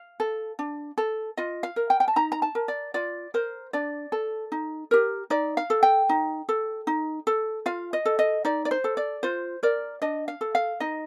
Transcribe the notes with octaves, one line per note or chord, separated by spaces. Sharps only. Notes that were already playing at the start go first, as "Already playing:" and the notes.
Already playing: F5
A4
D4
A4
F4 D#5
F5
A#4
G5
G5
A5
D#4 A#5
A#5
A5
A#4
D5
F4 D5
A#4 C5
D4 D5
A4
D#4
G4 A#4
D#4 D5
F5
A4
G5
D#4
A4
D#4
A4
F4 F5
D#5
A4
D#5
D#4 D5
D5
C5
A4
D5
F4 C5
A#4 D5
D4 D#5
F5
A4
F5
D#4 D#5